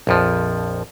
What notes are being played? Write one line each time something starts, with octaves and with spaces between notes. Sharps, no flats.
A#1 F2 F3